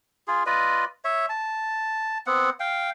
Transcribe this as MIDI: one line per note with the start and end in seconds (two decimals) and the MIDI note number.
0.28 0.43 65
0.28 0.43 68
0.46 0.85 65
0.46 0.85 71
0.46 0.85 74
0.46 0.85 75
1.04 1.26 73
1.04 1.26 76
1.29 2.18 81
2.27 2.50 59
2.27 2.50 60
2.27 2.50 78
2.60 2.90 77
2.60 2.90 79